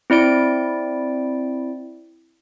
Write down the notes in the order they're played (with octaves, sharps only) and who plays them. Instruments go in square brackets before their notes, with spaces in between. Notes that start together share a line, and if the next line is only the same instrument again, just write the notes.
[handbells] C4 E4 D5 D7